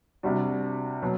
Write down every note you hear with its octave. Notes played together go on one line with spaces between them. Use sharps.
C3 G3 D4 F#4
B2 F#3